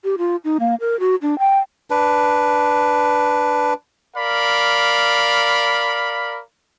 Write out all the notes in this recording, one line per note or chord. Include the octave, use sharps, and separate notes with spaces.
G4
F4
D#4
A#3
A#4
F#4
D4
G5
D4 B4
A#4 D5 F5 B5